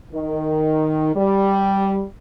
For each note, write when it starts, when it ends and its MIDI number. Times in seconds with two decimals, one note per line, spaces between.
0.14 1.10 51
1.15 2.02 55